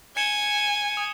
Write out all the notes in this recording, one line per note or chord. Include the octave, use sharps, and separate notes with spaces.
G#5 G#6 C#7 E7 G7
D#6